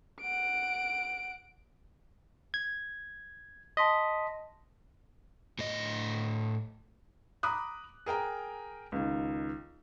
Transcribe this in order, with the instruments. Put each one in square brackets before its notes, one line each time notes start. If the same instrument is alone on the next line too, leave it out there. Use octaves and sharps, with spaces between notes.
[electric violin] F#5 D7
[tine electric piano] G#6
[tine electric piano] D#5 [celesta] A5 C6 B6
[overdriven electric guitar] A2 D#5
[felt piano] A#5 B5 D6 D#6 F#6
G#4 A#4 G5 A#5
C#2 D#3